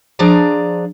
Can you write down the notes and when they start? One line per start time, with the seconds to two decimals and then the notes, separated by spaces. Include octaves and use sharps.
0.19 F3 D4 G#4 D5 A#5